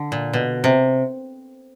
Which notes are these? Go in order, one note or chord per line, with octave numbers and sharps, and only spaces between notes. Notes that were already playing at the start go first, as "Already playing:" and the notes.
Already playing: D3
A#2
B2
C3